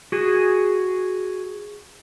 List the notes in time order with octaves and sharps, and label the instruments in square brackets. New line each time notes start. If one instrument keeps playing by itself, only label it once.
[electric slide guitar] F#4 G#4